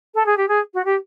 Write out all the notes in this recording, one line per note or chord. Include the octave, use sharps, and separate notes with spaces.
A4
G#4
G4
G#4
F#4
G4